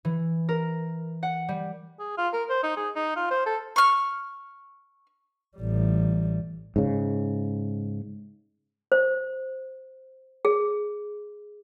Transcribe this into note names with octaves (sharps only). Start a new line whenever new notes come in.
E3
A#4
F#5
G3
G#4
F4
A#4
C5
D#4
G#4
D#4
F4
C5
A4
C#6 F6
A1 G3
G#2 C#3
C5
G#4